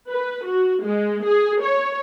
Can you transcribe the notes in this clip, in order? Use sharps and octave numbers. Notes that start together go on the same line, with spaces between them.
B4
F#4
G#3
G#4
C#5